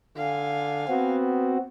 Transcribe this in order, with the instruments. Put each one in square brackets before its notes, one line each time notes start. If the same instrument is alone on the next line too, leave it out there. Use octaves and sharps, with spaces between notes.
[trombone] D3 [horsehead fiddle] F5 G#5
[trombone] B3 [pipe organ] C4 F#4